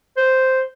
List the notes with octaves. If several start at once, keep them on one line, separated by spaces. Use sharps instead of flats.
C5